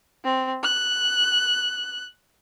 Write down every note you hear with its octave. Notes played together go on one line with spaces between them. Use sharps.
C4
F#6